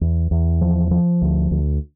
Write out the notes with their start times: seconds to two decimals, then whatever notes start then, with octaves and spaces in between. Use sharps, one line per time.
0.01 E2
0.31 E2
0.61 F3
0.91 F3
1.22 D2
1.51 D2